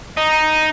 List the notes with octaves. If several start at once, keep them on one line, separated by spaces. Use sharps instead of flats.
D#4